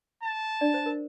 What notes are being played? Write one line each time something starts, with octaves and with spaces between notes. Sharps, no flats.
A5
D4 D5
C5
A#4